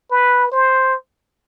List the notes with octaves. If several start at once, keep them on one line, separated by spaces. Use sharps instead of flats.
B4
C5